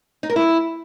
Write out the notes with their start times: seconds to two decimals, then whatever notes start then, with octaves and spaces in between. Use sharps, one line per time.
0.23 D#4
0.30 A#4
0.36 E4